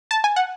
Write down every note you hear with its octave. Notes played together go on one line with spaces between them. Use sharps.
A5
G#5
F#5